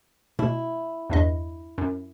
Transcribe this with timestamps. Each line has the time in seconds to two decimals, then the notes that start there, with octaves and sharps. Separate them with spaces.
0.39 B2 E4
1.10 E2 G2 D#5
1.78 F#2